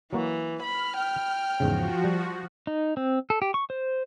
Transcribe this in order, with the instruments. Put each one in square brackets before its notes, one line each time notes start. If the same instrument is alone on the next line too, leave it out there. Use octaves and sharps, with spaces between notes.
[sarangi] E3 [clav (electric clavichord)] F#3 A#3 F#4
[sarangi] B5 [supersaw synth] F6
[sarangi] G5
[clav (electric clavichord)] E2 G#2 C#3 [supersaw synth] F3 F#4
[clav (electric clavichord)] G3
[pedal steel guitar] D#4
C4
A4
G4
C#6
C5